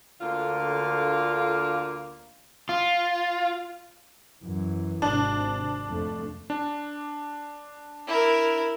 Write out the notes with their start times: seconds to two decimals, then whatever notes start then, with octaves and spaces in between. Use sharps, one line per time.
0.21 D2 D3 A#3 F4 F5
2.69 F4
4.44 F#2 E3
5.02 G#1 C3 D4
5.87 F2 A3
6.50 D4
8.07 E4 A#4